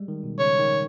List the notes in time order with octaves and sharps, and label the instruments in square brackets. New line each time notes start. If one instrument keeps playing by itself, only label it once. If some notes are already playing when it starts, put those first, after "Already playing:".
Already playing: [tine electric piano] G3 G#3
D#3
B2
[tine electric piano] C#3 [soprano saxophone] C#5
[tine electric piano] D#3